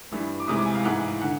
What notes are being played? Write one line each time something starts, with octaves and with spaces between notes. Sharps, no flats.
G2 E3 G3
D6
C2 C3 E3 G#3 D#6
D6
G#5
F5
G#2 E3 G#3 F#5
D3 F#5